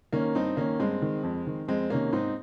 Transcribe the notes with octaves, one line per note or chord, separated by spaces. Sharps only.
D#3 A#3 C#4
G2 C4 D#4
D#3 A#3 C#4
G2 G#3 C4
D#3
F2
D#3
F2 G#3 C4
C3 D#3 A#3 C#4
G#2 C4 D#4